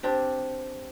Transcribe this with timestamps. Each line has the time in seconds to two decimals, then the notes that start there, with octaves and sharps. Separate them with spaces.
0.03 C4 D4 G4